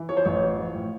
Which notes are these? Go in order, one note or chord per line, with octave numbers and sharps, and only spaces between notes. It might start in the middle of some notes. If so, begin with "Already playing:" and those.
Already playing: E3
F3 C#5
C5
A1 C#5
F3
F3
A2